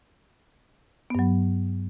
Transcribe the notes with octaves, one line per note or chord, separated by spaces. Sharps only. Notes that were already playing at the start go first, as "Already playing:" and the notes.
G2 F#3 B3